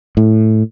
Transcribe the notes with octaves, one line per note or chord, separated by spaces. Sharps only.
A2